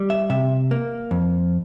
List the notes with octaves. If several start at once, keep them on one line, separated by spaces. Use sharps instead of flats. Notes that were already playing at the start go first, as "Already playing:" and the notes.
Already playing: G3
E5
C3 E5
A#3
F2